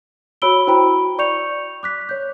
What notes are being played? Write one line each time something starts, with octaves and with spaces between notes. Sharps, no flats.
F#4 C#5 B5 E6 D7 G7
E4 F#4 C5 G5 A#5 B5
D5 C#6 G6 C#7 F7
D6 F#6 B6
C#5 G6